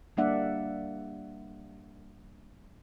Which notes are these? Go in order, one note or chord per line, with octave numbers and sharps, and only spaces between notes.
G3 A#3 D4 D5 E5 F#5